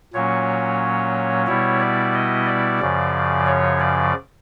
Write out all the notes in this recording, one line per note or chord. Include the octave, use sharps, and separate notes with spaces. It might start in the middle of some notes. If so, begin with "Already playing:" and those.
A#2 F#3 A#3 C#4 C#5
B2 G3 B3 E4 C#5
D5
D#5
D5
F#2 C#3 F3
C#5
D5